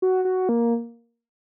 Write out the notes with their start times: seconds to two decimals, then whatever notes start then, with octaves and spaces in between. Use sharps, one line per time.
0.02 F#4
0.25 F#4
0.49 A#3